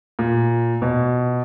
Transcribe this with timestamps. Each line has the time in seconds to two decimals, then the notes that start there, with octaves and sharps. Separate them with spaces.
0.19 A#2
0.82 B2